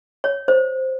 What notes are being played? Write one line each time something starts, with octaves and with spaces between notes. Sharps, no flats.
C#5
C5